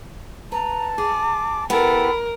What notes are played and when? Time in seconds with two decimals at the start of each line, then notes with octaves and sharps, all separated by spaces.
0.52 B4 A5 A#5
0.98 G#4 D6
1.70 B3 E4 G4 A4 A#4 B5